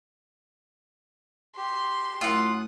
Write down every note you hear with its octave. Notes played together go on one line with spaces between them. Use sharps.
G4 C6
F#2 A3 E4 F4 A#4 F#5 D#6 F#6